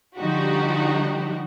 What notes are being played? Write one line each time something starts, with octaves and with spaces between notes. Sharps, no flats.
D3 F3 G3 D#4 F#4 G4